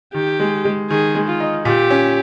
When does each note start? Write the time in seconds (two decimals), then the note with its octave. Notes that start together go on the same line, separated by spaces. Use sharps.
0.14 D#3 G4
0.40 G#3
0.65 G#3
0.90 D#3 G#4
1.15 G#3
1.28 F4
1.40 D#4
1.65 A#2 G4
1.90 C#4